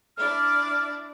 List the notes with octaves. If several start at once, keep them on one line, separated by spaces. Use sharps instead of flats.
D4 E4 D5 F6